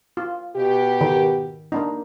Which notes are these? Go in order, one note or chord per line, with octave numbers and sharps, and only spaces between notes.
F4
B2 G4
D#3
A#3 D4 D#4